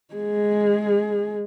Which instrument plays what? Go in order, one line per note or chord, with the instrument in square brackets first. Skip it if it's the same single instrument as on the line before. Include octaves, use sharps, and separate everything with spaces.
[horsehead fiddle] G#3 G#4